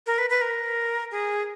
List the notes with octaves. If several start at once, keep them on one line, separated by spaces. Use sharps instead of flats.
A#4
B4
B4
A#4
G#4